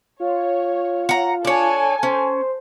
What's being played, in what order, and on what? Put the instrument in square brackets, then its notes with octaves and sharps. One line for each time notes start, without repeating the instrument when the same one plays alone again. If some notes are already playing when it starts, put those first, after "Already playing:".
[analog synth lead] F4 [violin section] C#5
[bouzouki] F#5 A#5
[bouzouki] D4 C#5 [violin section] A4 G#5
[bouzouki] C#4 [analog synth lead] C5